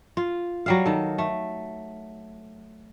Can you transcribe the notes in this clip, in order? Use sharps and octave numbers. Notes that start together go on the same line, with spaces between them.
F4
F#3 G3 F5
D#3 A4
A3